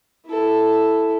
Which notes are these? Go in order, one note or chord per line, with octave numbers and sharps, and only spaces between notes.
E4 A4